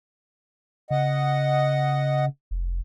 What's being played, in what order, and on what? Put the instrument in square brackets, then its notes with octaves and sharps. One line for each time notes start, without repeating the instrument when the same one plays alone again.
[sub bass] C#3 [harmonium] D#5 F#5
[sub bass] F1